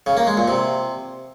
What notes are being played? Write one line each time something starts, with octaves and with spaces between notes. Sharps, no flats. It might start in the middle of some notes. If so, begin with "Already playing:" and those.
C#3
A#3
G#3
A#2
C3